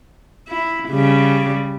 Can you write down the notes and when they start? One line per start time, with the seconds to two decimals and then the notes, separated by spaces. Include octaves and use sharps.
0.48 E4
0.90 C#3 G3